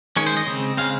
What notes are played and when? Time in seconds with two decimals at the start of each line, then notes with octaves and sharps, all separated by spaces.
0.16 D#3 G#3 C#4 C#5
0.26 C5
0.37 D#5
0.47 C#3 G#3 C4
0.77 C#3 G#3 C4 F5